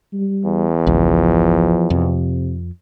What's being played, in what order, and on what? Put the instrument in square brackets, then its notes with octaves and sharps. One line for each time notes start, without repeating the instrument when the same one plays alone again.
[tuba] G3
[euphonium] E2
[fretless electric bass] G#1 C#2 [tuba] F3
[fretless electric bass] F2 [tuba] C3